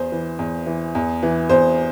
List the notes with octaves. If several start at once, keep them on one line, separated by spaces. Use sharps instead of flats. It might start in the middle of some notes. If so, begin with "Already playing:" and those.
Already playing: E2 C5
E3
E2
E3
E2
E3
E2 C5